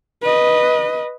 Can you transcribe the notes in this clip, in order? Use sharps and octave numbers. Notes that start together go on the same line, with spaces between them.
B4 D#5